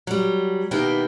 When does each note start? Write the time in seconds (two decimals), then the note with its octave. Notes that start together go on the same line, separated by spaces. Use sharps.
0.07 F#3 G3
0.71 B2 D#3 A#3 B3 E4 G4